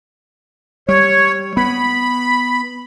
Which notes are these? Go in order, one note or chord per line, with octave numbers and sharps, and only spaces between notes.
G3 C#5
B3 B5